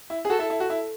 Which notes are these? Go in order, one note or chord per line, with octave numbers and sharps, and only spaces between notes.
E4
G#4
F#4 A4
E4
E4
F#4
E4